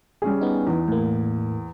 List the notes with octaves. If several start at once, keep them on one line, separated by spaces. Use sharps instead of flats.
G3 C#4 G#4
B3 D#4
E2
A2 A#3